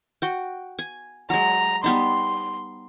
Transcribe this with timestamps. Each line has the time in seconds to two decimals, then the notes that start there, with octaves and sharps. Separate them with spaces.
0.22 F#4 G5
0.79 G#5
1.30 F#3 G#3 A#5
1.84 G3 B3 D#4 C6